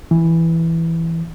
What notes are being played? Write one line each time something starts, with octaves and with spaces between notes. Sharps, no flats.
E3